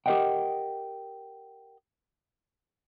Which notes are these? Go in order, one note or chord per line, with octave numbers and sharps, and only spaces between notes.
G4 A#4 B4 D#5 F#5 G5